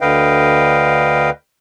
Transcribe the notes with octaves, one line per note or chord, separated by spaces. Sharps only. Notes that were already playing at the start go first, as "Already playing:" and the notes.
D2 D3 B4 D#5 F5 G5